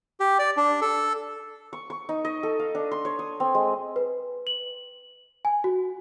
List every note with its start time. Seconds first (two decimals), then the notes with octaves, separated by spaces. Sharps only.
0.20 G4
0.39 D5
0.57 D4
0.81 A4
1.73 C#6
1.90 C#6
2.09 D#4
2.25 D#5
2.43 A4
2.59 F5
2.75 D4
2.91 C6
3.05 C#5
3.19 D#6
3.40 C4
3.55 G#3
3.96 B4
4.47 F#7
5.45 G#5
5.64 F#4